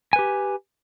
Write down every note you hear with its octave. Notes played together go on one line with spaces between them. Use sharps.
G4 B4 G#5